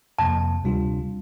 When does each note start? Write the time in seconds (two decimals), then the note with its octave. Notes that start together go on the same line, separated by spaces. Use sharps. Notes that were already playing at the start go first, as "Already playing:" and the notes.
0.19 F2 C3 F3 A#3 A5
0.63 D2 C3 G3 D4 F4